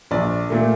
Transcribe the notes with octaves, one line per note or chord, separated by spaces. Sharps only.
A#1 D5
A#2 A3